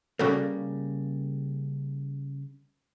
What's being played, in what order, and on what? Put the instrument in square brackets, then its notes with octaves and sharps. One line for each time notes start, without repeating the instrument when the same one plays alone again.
[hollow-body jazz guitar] C#3 G3 A#3 [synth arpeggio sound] C#4 F#4 A4